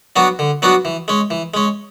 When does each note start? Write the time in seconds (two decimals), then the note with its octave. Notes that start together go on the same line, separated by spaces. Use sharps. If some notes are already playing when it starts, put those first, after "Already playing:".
0.16 F#3 B3 D4 F#4
0.39 D3
0.62 F#3 B3 D4 F#4
0.85 E3
1.08 G#3 C#4
1.30 E3
1.54 G#3 C#4